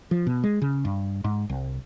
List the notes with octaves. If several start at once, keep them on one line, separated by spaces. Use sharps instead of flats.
F3
B2
G#3
C#3
G2
G#2
C2